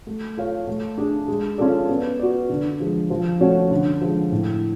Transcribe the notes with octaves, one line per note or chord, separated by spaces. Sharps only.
A3
F4 A4 C#5 F5
A3
D4 G#4
G#3
C#4 F4 A4 D5
B3
F#4 B4 D5
D3
F3 G#3
F3
A3 C#4 F#4 C#5
D3
F3 G#3
A2